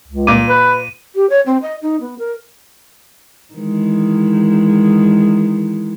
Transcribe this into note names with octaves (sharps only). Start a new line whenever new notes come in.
C#2
A#2 D6 D#7
B4
G4
C#5
C4
D#5
D#4
B3
A#4
D#3 E3 G#3